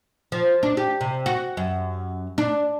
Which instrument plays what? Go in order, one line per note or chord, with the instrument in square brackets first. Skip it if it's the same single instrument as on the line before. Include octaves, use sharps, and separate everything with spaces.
[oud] F3
D4
G4
C3
F#4
F#2
D4